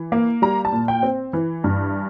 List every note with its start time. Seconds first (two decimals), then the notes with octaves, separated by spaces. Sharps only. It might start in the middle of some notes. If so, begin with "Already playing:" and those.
Already playing: E3
0.12 A#3
0.42 G3 A#5
0.65 A5
0.72 A#2
0.88 G5
1.03 C4
1.33 E3
1.64 G2